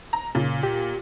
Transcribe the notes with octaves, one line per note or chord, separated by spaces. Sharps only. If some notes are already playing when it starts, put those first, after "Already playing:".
A#5
A#2 C#3
G4